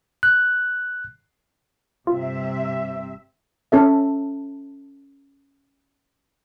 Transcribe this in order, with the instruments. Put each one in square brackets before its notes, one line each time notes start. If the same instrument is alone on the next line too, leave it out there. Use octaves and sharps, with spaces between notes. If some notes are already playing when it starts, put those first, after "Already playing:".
[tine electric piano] F#6
[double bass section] G1 C3 C4 [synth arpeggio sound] F4 [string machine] E5
[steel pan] C#4 A4 E5